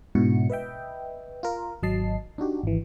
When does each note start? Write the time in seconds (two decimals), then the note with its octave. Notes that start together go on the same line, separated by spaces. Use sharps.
0.15 G#2 B2 D4 E4 F#4 C#7
0.50 B4 D#5 E5 G5
1.43 F4 A#4
1.83 G#1 F#3 D#5 A5 C7
2.38 D4 D#4 F#4 G4
2.63 G#1 E3